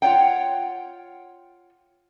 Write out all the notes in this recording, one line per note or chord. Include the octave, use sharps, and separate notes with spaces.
F4 C#5 F#5 G5